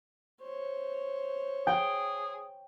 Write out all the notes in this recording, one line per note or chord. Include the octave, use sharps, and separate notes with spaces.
C5 C#5
G#4 G5